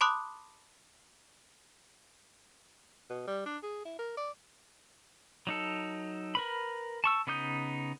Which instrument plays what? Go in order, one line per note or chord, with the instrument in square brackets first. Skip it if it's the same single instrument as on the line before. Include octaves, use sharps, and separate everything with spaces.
[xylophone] A5 B5 C6 D6 D#6 F#6
[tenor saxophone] B2
G3
D4
G#4
E4
A#4
D5
[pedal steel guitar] F#3 D#4 A4
A#4 B4 B5
A5 C#6 E6
C#3 B3 D#4 D#6 G6